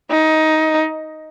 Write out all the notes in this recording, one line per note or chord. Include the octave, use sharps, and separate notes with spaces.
D#4